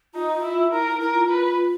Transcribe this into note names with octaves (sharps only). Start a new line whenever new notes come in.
D#4 F4
E4
E4 A#4
E4 A#4
F4
B4